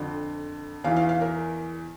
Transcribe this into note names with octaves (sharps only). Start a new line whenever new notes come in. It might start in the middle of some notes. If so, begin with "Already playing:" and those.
Already playing: F2 D3
E2 E3 F5
F5
F5
A#4